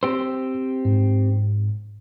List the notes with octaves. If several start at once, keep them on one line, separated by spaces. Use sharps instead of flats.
C4 G4 C5 E6
G#2